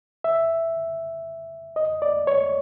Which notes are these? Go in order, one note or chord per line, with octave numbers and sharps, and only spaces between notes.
E5
D#5
D5
C#5